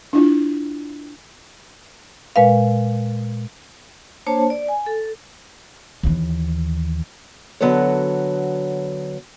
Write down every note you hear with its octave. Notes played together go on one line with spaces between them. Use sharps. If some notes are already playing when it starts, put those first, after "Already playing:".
D4 E4 F4
A#2 G#3 B4 F5
A#3 D4 C5 C#5 A5
D5
G#5
A4
D#2 E3
D3 F#3 B3 F#4 A4 C#5